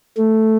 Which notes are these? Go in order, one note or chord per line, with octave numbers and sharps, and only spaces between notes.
A3